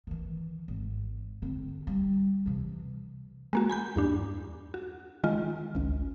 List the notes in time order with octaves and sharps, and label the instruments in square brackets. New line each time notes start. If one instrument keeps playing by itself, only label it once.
[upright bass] D#3 E3
G#1
D3 C4
G3
C3 E3
[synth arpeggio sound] G#3 A#3 F#4
G#5 B5 G6
E2 G2 D4
F#4
D#3 G#3 F4
G#1 C#2